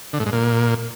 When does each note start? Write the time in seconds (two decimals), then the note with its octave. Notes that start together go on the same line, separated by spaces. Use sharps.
0.13 D3
0.20 A2
0.26 G#2
0.32 A#2